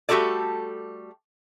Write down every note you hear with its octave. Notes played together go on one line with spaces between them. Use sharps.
G3 A3 F#4 G4 A4 D5